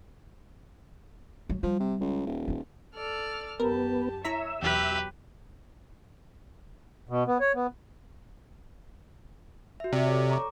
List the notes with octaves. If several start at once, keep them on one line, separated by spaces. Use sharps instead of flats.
F#3
F3 G3
C3
C#2
D#1
F3 F4
A4 D5 F6
F#2 B3 G4 A#4 A5
E4 C#5 E5 A#5 B6
E2 B2 F#3 G4 B4
B2
B3
C#5
B3
F#4 E5
C3 D5 D6
A4 C#5
A#5 C#6 D6